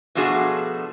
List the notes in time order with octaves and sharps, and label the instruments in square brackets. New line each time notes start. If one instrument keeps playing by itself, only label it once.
[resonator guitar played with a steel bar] B2 F3 A3 D4 F#4 G#4